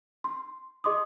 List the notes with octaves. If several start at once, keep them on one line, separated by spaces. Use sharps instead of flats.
C6
G#4 D#5 C6 D6 D#6